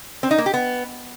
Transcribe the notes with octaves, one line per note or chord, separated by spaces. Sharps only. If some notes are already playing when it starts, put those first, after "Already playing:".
C4
D#4
A#3
G4
B3